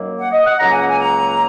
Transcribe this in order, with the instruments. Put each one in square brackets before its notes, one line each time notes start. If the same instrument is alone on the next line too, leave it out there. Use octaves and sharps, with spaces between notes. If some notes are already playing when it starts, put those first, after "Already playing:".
Already playing: [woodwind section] F#2 D#3 F#3 A#3
F#5
D#5
F#5
C#2 C#3 F#3 A#3 A#5
G#5
F#5
G#5
A#5